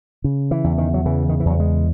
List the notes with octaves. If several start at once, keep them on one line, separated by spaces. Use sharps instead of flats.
C#3
E3
E2
D#3
F#3
C#3 E3
D#3
E3
E2 F#3
G#3